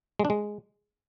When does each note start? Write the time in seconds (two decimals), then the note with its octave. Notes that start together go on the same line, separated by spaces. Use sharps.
0.19 G#3
0.25 D4
0.30 G#3